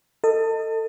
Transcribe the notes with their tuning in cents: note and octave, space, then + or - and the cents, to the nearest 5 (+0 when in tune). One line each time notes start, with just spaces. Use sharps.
A4 +30 D#5 +0